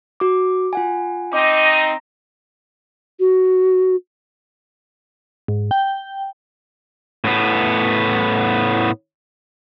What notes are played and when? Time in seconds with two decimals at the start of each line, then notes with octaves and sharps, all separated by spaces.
0.20 F#4 D6
0.73 F4 F#5 G#5
1.33 C4 D#4 D#5 D6
1.64 A#5 A#6
3.20 F#4
5.48 G#2
5.71 G5
7.24 A2 B3